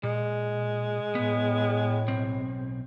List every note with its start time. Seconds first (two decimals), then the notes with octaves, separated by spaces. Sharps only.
0.03 A#2 G#3
1.15 A2 B3
2.08 B1 C4